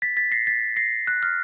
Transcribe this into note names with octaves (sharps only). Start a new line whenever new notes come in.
A6 B6
A6 B6
A#6 C7
A6 B6
A#6 C7
F#6
F6